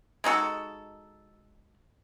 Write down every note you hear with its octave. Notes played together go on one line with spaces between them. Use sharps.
G#3 D#4 F#4 A4